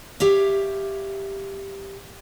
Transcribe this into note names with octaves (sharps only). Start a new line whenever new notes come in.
G4 C#5 E5 F5